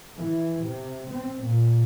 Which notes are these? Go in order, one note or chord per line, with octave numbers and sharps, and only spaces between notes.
E3
C3
C4
A#2